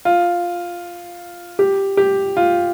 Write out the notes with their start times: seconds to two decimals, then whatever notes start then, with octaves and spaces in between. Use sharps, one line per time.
0.05 F4
1.59 G4
1.97 G4
2.37 F4